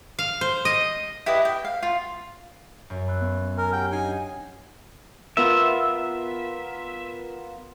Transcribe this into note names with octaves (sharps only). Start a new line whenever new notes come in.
F5
C5
D#5
E4 G4 B4 D#5
G5
F5
F4
F#2
B5 E6 F#6
B3
A#4 G#5
G4 F#5 G5
D4 D#4 G#5 C7
B3 F4 A#4 E5